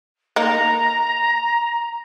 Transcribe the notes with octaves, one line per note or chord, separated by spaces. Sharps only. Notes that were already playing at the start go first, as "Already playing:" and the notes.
A#3 D#4 A#5